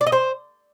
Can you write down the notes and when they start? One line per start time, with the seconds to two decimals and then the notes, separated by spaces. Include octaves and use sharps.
0.01 D5
0.07 D#5
0.12 C5